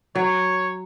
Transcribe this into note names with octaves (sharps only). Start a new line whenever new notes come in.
F#3 C#5